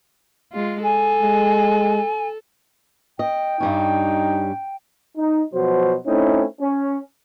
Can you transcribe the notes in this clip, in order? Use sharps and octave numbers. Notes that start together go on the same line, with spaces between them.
G#3 F4
A4 G#5
G#3
D#5 G5
G2 G3 C#4 D#4
D#4
B2 F3 F#3 F#4 C5
A3 C4 C#4 D#4 E4
C#4